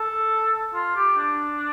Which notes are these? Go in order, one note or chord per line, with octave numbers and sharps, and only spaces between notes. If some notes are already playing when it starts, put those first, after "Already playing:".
Already playing: A4
F4
G4
D4